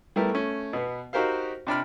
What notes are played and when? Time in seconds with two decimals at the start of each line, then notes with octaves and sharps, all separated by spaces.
0.16 G3 A3 B3 E4 A#4
0.31 A3 C#4
0.73 B2 B3
1.13 D#4 F#4 G4 A#4 C5 F5
1.67 C3 D4 B5 F6